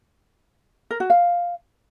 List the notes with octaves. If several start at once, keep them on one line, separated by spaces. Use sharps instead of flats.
A#4
F#4
F5